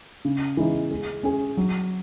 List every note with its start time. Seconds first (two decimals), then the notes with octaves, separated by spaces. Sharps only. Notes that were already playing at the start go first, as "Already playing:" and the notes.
0.25 C#3
0.57 E3 G#3 D#4
0.91 G#3
1.23 C#4 G#4
1.57 F#3